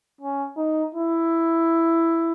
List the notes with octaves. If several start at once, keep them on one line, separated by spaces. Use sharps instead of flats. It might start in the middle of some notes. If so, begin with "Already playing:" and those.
C#4
D#4
E4